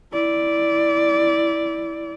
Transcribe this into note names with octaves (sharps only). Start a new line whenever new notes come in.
E4 D5